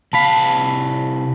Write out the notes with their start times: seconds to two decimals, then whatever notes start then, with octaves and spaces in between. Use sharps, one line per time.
0.13 C2 F5 A5 B5 B6